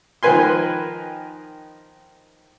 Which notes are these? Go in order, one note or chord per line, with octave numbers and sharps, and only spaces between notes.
D#3 F3 B4 G#5 C6